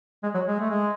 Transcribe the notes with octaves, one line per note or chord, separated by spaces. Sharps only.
G#3
F#3
G#3
A3
G#3